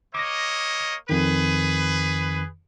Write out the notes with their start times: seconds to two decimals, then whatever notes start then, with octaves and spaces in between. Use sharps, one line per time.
0.15 A#3 C#5 D#5 D6 A#6
1.09 F2 D#3 G#4 B4